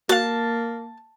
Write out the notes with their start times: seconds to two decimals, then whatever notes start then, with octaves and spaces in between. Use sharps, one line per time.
0.09 A#3 F#4 F5 A5